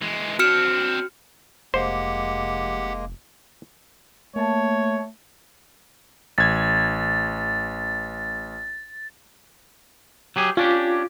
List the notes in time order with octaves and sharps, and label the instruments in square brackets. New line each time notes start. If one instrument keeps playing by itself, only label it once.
[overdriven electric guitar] E3 G#3
[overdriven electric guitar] C4 D4 [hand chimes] F#4 F6 C#7
[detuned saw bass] F1 [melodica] G#3 A#3 [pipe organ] G4 F#5 [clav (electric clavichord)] C5
[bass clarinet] A3 [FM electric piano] A#3 A5 [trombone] C#5
[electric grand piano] A1 G#6 [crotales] A6
[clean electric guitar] F#3 G4 G#4
[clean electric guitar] C#4 D4 G4 [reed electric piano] F4